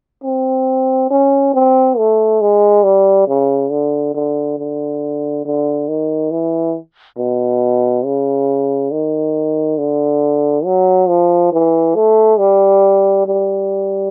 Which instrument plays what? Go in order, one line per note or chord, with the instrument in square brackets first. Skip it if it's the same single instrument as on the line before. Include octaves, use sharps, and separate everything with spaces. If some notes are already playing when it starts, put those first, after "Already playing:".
[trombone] C4
C#4
C4
A3
G#3
G3
C#3
D3
D3
D3
D3
D#3
E3
B2
C#3
D#3
D3
F#3
F3
E3
A3
G3
G3